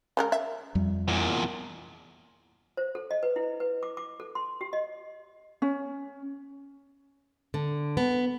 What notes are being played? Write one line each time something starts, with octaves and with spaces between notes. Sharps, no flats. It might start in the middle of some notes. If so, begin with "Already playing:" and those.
C#3 G#3 A#4
E5
F2 G3
E2 A#2
C5
A4
D#5
B4
E4
B4
D6
D6
A4
C6
G4
D#5
C#4
D3
B3